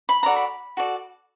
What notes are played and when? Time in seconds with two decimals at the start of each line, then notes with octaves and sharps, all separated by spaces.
0.09 B5
0.23 F#4 A4 D5 A#5
0.36 B5
0.77 F#4 A4 D5